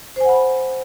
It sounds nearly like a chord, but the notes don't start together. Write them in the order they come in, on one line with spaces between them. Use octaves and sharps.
C5 G#5 F#5 B5